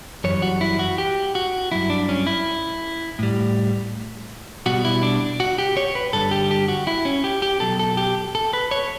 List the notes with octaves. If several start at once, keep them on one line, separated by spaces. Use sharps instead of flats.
F#2 E3 G3 C#5
F#4
E4
F#4
G4
F#4
G2 F#3 E4
D4
C#4
E4
A2 G3
B2 G3 F#4
E4
D4
F#4
G4
C#5
B4
G2 D3 G3 A4
G4
G4
F#4
E4
C#4
G4
G4
B2 F#3 A4
A4
G4
A4
B4
C#5